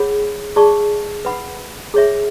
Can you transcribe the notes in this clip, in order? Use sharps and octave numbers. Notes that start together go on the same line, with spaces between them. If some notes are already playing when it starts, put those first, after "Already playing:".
Already playing: G#4 C#5 F#5 B5
G#4 D5 A5 C#6
B4 F#5 B5
G#4 C#5 E5